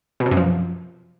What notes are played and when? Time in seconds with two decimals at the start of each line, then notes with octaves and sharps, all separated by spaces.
0.20 B2
0.26 C3
0.31 F#2
0.37 F3